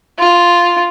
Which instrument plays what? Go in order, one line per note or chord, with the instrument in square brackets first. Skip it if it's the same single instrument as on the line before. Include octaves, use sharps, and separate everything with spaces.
[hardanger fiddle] F4